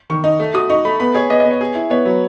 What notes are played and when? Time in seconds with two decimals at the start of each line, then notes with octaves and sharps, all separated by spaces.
0.10 D#3 C#6
0.24 D#4
0.40 A3
0.54 F#4 D#6
0.70 D#4 C#6
0.85 A3 B5
1.00 B3 B5
1.14 G#4 C#5
1.30 B3 D#5
1.40 D#5
1.45 B3
1.51 C#5
1.61 G#4
1.75 E4
1.90 B3 C#5
2.05 F#3 B4